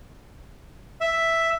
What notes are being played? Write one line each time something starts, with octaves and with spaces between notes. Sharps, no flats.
E5